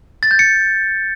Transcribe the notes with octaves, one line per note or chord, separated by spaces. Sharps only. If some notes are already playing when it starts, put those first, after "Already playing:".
A6
G6
C#7